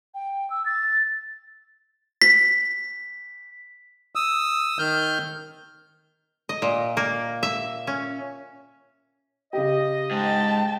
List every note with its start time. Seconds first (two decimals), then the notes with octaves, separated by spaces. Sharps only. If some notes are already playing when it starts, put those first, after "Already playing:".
0.14 G5
0.50 E6
0.66 A6
2.22 B6
4.15 D#6 E6
4.79 D#3 F6 G6
6.49 D#5
6.62 A#2
6.97 A#3
7.43 E5
7.87 C#4
9.53 C#3 G4 D#5
10.11 G#2 G5 A5